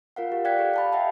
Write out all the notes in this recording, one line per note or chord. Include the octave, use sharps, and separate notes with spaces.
F4 A#4 F5 F#5
G4
D5 F5 G5 F#6 G#6 B6
G4 A4
F5 A5 B5
D#5 E5 F#5 G5 A5